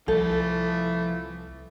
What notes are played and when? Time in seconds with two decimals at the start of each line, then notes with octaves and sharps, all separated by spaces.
0.08 C2 E3 F3 A3 A4